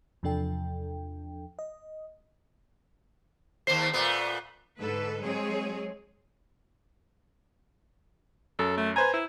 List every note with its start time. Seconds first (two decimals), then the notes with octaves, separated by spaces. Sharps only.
0.23 E2 C3 F3 D4 A4 G5
1.59 D#5
3.67 D#2 A#3 C5 C7
3.93 A#2 A3 B3
4.80 G#2 D3 A4 B4
5.22 F#3 G#3 C4 G#4 C#5
8.59 F#2 A4
8.77 A3
8.96 B4 C5 G#5 A#5
9.13 E4